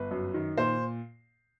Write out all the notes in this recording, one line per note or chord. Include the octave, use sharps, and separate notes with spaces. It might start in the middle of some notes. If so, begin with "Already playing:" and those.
Already playing: G1 B4
F#2
D#3
A#2 C5